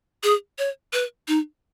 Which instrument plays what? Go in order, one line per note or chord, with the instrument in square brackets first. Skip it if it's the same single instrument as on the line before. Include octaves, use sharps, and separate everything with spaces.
[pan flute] G#4
C#5
B4
D#4